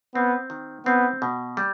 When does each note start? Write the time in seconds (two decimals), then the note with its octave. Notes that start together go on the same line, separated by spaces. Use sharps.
0.15 B3 C4
0.50 D#3
0.86 B3 C4
1.22 B2
1.57 G3